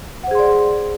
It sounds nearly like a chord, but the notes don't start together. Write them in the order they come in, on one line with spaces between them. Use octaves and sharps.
F#5 C5 G#4 C6 D5